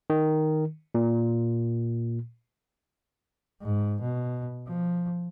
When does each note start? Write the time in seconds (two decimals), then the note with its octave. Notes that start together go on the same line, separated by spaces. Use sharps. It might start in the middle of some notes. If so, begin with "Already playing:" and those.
0.10 D#3
0.95 A#2
3.62 G#2
4.02 B2
4.67 F3